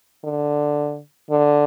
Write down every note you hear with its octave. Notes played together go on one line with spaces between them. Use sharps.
D3
D3